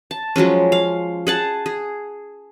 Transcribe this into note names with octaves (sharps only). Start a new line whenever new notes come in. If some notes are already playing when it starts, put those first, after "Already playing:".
A5
F3 F#3 G#3 C#4
F5
G#4 F#5 A5
G#4